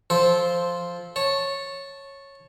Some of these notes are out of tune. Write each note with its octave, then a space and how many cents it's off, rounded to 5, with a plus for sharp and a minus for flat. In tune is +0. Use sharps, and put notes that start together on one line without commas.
F3 +0 A4 -20 C5 +0
C#5 -10 A5 +0